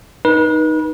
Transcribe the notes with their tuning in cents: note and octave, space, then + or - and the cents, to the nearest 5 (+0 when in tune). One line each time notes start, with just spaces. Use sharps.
D#4 +0 B4 -35